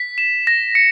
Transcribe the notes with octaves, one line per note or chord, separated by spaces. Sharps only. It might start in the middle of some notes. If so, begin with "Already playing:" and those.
Already playing: B6
E7
A#6
C#7